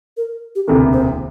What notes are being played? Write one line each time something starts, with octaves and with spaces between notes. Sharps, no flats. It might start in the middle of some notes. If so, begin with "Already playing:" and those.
A#4
G4
E1 D2 C3 E3 A#3 A4
C5